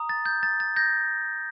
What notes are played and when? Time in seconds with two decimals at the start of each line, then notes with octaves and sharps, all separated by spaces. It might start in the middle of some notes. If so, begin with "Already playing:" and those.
Already playing: A#5 D#6
0.09 A6
0.26 G6
0.43 A6
0.60 A6
0.76 G6 A#6